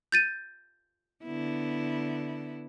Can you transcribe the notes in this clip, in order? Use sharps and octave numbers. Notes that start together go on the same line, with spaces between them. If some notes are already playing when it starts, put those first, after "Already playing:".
G6 A6 D#7
D3 B3 E4